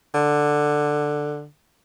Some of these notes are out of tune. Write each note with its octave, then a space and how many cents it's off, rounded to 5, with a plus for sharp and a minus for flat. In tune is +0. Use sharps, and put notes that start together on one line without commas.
D3 +10